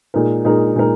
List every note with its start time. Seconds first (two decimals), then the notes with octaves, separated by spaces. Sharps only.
0.14 A#2 G#3 D#4 A#4
0.45 A#2 G#3 D#4 A#4
0.76 A#2 G#3 D#4 A#4